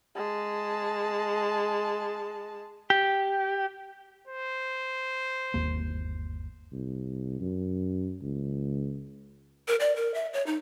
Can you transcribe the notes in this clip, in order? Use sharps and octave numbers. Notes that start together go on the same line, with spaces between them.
G#3 A5
G4
C5
G1 D#2 A#3
C2
F#2
C#2
A#4
D5
A#4
E5
C#5
D#4